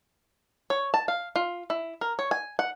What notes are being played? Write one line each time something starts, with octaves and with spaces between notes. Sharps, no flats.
C#5
A5
F5
F4
E4
A#4
C#5
G#5
F#5